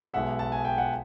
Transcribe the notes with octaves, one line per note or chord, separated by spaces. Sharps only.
B1 B2 G#3 E5 F#5
A5
G#5
G5
F#5